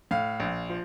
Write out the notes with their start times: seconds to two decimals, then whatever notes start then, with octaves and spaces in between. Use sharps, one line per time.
0.11 A2 F5
0.40 A#1
0.70 F3